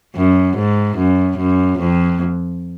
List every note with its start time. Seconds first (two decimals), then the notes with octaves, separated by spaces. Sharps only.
0.16 F#2
0.57 G#2
0.97 F#2
1.37 F#2
1.79 F2